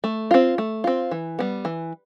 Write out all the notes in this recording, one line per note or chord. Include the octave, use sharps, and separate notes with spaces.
A3
C4 F4
A3
C4 F4
E3
G3 B3
E3